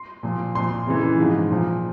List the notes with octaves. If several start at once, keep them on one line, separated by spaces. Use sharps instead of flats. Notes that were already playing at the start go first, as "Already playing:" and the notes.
Already playing: C6
A#2 F3
A#2 F3 C6
F2 C#3 E3
G#2 F3
A#2 F3